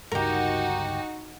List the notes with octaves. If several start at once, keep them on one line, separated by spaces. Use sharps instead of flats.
G1 C#2 G2 D#4 F#4 G4 A#4